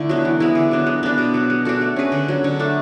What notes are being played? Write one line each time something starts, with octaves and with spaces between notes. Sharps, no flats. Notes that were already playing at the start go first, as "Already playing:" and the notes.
Already playing: D3 A3 E4
F#3 B3
E3
G#3 B3 E4
D3
F#3 B3 D4
G#3
B3 D4
B2
F#3 B3 F#4
G#3
D4 F#4 A4
A3
C#4 G#4 B4
D3
F#3 C#4
D3
A3 D4 A4